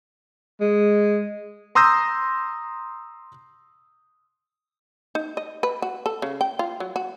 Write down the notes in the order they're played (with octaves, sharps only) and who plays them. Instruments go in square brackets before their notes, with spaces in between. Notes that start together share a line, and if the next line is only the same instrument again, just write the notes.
[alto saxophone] G#3
[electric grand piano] A#5 C6 D#6 E6 G6 A#6
[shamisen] D#4
D#5
B4
F#4
A4
C#3
G5
F4
F#3
F#4